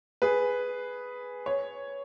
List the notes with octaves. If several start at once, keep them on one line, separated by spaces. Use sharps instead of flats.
G#4 B4
C#5